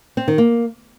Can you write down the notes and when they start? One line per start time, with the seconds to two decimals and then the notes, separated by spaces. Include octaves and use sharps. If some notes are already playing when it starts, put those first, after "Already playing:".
0.17 C4
0.28 D#3
0.38 A#3